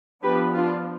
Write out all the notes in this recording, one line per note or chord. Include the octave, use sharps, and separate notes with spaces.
F3 B3 D4 G4 B4
D4 F4